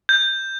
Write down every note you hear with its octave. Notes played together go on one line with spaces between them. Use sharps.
G6